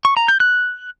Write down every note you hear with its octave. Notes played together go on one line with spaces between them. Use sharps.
C#6
A#5
G6
F#6